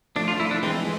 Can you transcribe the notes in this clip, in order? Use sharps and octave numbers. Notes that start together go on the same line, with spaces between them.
F3 A3 D4
F4
E4
D4
E3 G#3 C4